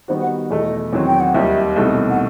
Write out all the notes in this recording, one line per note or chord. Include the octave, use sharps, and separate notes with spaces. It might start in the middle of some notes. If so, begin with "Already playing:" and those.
D#3 G3 B3 D#4 F#4 C5
F#5
E2 B2 A3 D#5
E2 D#3 F#3 C4
G5
F#5
D#2 D#3 G3 D#4 E5
C2 B2 A3 D#4
F#5